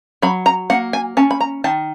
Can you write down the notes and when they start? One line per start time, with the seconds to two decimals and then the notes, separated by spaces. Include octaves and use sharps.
0.22 F#3 B5
0.46 A#5
0.70 A#3 F#5
0.93 G#5
1.17 C#4 A5
1.31 B5
1.40 A#5
1.64 D#3 A5